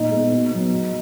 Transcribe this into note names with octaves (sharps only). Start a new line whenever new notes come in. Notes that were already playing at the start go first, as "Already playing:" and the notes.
Already playing: A#2 D#4
G#3 B3
B2
F#3 B3
B2